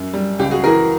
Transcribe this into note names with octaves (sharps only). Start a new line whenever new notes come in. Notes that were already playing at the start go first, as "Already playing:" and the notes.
Already playing: F#2
G3
C#2 G4
F#4 G#4
E3 G#4 A#4